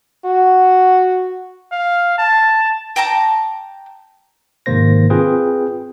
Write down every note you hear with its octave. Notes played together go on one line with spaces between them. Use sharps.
F#4
F5
A5
G5 A5 A#5 D6
G#2 C3 D#3 A#3 C5 A#6
C4 F4 G#4 B4 G5